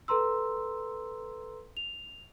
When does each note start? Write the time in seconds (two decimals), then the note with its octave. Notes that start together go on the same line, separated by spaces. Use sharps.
0.08 A4 B4 A#5 C6 E6
1.77 F7